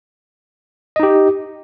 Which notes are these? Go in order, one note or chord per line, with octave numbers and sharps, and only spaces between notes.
D#4 G4 D#5